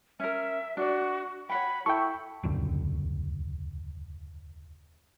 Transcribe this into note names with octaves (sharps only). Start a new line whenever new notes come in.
C#4 A#4 E5
D4 F#4 D5
C#5 F#5 G5 B5
E4 A4 G5 C#6
D#1 C#2 F#2 D3